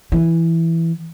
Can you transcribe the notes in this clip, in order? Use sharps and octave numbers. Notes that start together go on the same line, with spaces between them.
E3